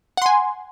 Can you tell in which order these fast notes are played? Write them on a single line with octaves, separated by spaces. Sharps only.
F#5 C6 G#5